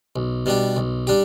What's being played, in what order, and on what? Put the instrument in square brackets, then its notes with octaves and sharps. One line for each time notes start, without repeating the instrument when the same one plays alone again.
[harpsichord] B1
B2 G3 D4 G4
B1
G3 D4 G4